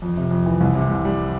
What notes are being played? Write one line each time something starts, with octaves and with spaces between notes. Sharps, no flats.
F2
C3
F2
E3
C2
C3
C2
G3